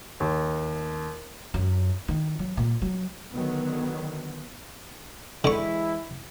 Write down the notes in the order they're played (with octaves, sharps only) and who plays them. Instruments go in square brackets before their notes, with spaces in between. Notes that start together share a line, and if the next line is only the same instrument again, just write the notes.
[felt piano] D#2
[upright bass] F#2
D#3
F#3
A#2
F#3
[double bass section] D3 D#3 F#3 B3
[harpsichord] D3 C#6 [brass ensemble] E3 G#3 E4